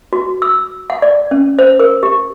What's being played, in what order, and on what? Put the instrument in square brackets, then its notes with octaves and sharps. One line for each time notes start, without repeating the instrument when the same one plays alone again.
[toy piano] F#4
E6
F#5
D5
C#4
C5
A#4
G4